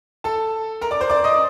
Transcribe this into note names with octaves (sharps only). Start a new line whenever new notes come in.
A4 A5
A#4 A#5
D5 D6
C5 C6
D5 D6
D#5 D#6